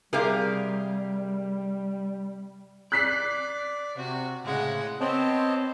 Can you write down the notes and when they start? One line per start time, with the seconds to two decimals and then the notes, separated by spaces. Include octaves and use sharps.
0.13 C3 G3 G4 G#4 A#4 F5
2.92 D5 F#6 B6 C7
3.97 C3 F#4
4.45 A2 C#3 G#3 F#5
5.01 B3 C4 C#5 D#5 A5